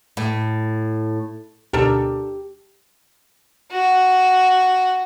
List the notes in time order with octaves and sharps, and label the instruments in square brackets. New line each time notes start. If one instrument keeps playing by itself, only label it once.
[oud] A2
[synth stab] D2 B2 [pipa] D4 A4 A#4 [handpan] G4
[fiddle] F#4